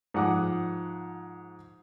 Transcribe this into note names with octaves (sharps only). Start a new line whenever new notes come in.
G#2 F3 F#5 D6 D#6